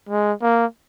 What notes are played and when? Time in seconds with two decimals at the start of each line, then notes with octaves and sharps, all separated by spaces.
0.09 G#3
0.42 A#3